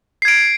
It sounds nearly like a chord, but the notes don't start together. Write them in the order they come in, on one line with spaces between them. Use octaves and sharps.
C7 G#6 D7